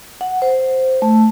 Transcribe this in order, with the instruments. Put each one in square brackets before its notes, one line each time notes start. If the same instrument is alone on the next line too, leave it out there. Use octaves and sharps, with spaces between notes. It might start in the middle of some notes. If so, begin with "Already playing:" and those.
[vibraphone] F#5
C5
A3